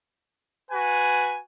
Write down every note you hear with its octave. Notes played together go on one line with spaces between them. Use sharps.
F#4 B4 G#5